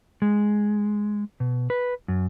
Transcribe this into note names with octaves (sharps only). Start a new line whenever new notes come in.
G#3
B2
B4
F#2